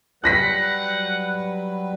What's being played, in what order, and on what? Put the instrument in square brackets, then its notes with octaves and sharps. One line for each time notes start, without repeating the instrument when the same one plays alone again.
[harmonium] F#3 G3 B4 [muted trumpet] F#5 [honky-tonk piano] F#6 A#6 B6